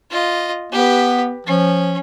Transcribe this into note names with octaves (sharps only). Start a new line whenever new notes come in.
F4 D#5
B3 G4 B4
F3 C#4